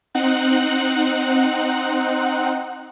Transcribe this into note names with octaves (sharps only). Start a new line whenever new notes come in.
C4 D#4 F#5 F#6